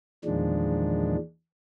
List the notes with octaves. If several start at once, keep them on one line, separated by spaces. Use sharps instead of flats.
E2 A#2 D#3 F3 G#3 D4